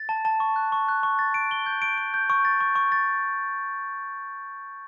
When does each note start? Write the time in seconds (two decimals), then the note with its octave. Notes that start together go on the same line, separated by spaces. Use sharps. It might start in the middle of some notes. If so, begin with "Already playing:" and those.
Already playing: A6
0.09 A5
0.25 A5
0.40 C#6
0.56 F#6
0.72 C#6
0.88 F#6
1.03 C#6
1.19 A6
1.34 D7
1.51 G7
1.66 G6
1.82 D7
1.98 D7
2.14 G6
2.30 C#6
2.45 A6
2.60 C#6
2.75 C#6
2.92 A6